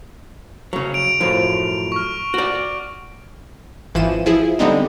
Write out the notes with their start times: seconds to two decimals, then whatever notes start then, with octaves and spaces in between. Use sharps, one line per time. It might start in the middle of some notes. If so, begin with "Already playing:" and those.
0.73 C#3 F#3
0.94 D7 F7
1.21 F#2 A2 F3
1.92 C#6 F6
2.34 F#4 D5
3.95 G#1 E3 F3 D#7 E7
4.26 F3 E4 G#4
4.59 D3 G3 G#3 B3 C4 D#4